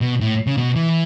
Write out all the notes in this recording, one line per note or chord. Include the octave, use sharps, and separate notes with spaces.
B2
A2
C#3
B2
E3